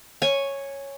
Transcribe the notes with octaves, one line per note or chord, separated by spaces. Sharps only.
C#5 G#5